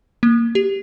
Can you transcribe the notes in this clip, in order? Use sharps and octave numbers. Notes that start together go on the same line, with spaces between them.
A#3
G4